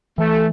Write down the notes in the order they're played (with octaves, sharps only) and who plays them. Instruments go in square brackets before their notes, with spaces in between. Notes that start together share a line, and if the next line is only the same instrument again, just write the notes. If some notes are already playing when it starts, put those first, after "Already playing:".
[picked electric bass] E3 [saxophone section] A3